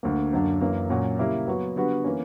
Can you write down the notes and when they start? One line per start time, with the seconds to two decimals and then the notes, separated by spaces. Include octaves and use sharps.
0.03 D2 D3 A#3
0.33 F#2 D3 F#3 A#3 D4
0.61 F#2 E3 A#3
0.90 A#2 F#3 C#4
1.19 C#3 G3 A#3 E4
1.47 F#3 B3 F#4
1.76 D3 G3 B3 F#4 B4
2.04 E3 A#3 C#4